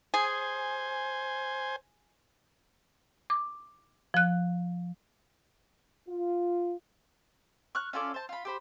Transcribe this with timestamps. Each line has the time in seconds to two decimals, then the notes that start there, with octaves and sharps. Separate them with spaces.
0.14 G#4 C5 G#5
3.30 D6
4.14 F3 F#6
6.08 F4
7.75 C#6 F6 F#6
7.93 C#4 F4 A4 D5
8.14 C5 A5
8.29 F4 B5
8.45 G4 C5 B5